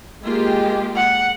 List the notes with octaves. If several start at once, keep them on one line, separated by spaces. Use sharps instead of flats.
G#3 A#3 F4 G4
F#5